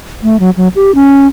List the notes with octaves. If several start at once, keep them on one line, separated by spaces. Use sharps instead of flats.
A3
F#3
F#3
G4
C#4